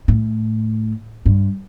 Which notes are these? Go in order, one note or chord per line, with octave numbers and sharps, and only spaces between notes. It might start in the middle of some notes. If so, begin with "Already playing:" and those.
A2
G2